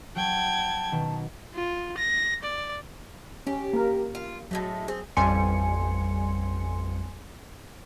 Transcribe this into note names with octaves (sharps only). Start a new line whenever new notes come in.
F#3 G5 A5 G#6
B2 D#3
F4
A#6
D5
C#4 G4
A#3 A#4
F4
A2 F#3 G#3 A3
C4 G#4
A1 F2 G3 G#5 C6 C#7